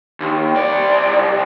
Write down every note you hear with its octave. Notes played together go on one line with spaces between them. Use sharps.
D#2
C2 D5